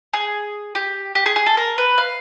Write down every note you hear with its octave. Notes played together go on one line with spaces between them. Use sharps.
G#4
G4
G4
G#4
G#4
A4
A#4
B4
F5